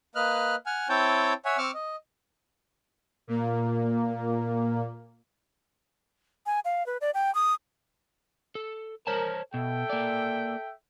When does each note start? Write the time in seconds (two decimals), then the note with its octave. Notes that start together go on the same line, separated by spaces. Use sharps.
0.15 A#3 B4 D#5 F6 F#6
0.66 F#5 G#5 F6
0.89 C4 E4 C#5 G5 A5 G6
1.45 C#5 E5 F#5 G#5
1.58 C4 C#6 D6 E6 F6
1.74 D#5
3.27 A#2 A#3
6.46 G#5
6.65 F5
6.86 B4
7.01 D5
7.14 G5
7.35 D#6
8.55 A4
9.07 A#4 C5 C#5 A5
9.54 B2 A4 E5 G5
9.90 A#3 D5